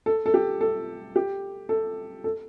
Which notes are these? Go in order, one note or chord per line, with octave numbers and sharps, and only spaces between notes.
A4
A4
G4
A4
G4
A4
A4